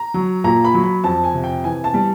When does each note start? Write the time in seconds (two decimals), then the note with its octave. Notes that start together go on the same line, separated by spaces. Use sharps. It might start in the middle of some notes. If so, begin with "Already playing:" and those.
Already playing: A#5
0.14 F#3
0.44 A#2 A#5
0.64 B5
0.74 F#3
0.84 B5
1.04 F2 A5
1.24 G#5
1.34 C3
1.44 G5
1.64 E3 G#5
1.84 A5
1.94 G3